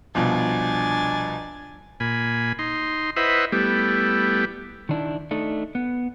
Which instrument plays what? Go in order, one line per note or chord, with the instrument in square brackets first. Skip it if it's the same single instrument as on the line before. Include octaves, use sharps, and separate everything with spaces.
[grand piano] C2 B2 F3 [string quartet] D4 G#5 A6
[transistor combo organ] A#2 G#5 B5
D#4 C6
E4 B4 C5 D#5 E5 F#5
G3 A3 B3 E4 G4
[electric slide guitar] D#3 D4 E4
A3 D4 D#4
B3